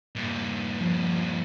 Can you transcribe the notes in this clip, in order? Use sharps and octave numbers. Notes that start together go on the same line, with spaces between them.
G2 A#2
F3